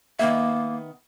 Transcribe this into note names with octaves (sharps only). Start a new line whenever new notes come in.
D#3 A#3 B3 E5